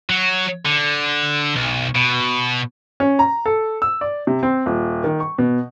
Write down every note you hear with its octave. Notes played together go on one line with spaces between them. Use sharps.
F#3
D3
B1
B2
C#4
A#5
A4
E6
D5
C3
C4
D#1
D#3
C#6
B2